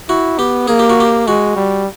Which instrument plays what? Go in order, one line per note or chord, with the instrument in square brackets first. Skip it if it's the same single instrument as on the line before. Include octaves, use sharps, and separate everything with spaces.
[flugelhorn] E4 [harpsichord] F#4
[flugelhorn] B3 [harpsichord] G4
[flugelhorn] A#3 [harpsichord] G#4
[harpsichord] G4
F#4
G4
[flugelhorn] G#3 [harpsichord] F#4
[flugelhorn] G3